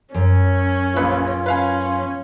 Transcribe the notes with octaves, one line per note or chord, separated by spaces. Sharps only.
F#2 C#4
A#1 F4 B4
C#4 B4 F5 G#5